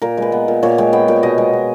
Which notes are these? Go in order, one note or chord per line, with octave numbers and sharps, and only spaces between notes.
A#2 A#4
G#3 B4
B3
A#2
A#2 C#5
G#3 G5
B3 G5
A#2 G5
B2 D#5
G#3
B3